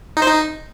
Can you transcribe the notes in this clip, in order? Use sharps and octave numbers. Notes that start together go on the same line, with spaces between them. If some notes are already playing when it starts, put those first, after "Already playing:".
D#4
C5
D#4